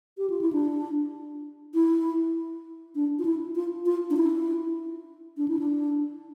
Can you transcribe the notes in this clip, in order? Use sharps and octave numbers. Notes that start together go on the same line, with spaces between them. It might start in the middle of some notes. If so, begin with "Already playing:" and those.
G4
F4
E4
D4
E4
D4
F4
E4
F4
F4
D4
E4
D4
E4
D4